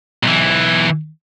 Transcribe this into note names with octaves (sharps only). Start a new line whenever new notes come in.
B1 E3